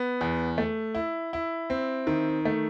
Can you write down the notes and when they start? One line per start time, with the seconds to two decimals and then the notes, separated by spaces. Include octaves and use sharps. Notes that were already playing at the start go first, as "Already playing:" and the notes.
Already playing: B3
0.21 E2
0.58 A3
0.95 E4
1.33 E4
1.70 C4
2.07 D#3
2.45 A3